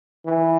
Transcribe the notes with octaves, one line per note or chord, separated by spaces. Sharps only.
E3